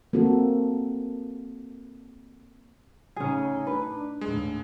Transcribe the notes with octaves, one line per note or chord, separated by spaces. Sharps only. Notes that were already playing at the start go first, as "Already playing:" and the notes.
A#3 C4 F#4 A4
A2 C#3 C#4 D#4 G#4
D4 B4
D#2 A2 G#3 D4